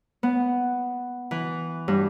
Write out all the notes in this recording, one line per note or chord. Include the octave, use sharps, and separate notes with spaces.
B3
E3
G2